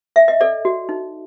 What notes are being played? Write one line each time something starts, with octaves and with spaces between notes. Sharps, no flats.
E5
D#5
A4 D5
F#4
D#4